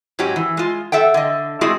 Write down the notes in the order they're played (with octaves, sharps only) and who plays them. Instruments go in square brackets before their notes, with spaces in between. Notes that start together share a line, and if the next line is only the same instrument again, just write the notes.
[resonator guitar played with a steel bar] G#2 F#3 C#4 F#4 G4
E3
G#3 F4
A4 E5 F#5 G5
D3 D#5
G#3 A3 C4 E4 F#4 G#4